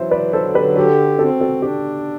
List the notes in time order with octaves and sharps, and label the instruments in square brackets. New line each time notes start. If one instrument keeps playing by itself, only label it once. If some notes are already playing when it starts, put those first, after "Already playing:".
Already playing: [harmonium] E3 F#3 [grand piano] C5 E5
[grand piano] B4 D5
[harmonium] D3 [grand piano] A4 C5
[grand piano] G4 B4
[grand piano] F#4 A4 [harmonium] G4
[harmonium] C4 [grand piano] F#4 A4
[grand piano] F#4 A4
[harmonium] D4 [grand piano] G4